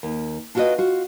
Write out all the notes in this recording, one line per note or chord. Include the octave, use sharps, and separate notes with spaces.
D#2
D4 F4 F#4 A4 B4 D#5
F4 F#4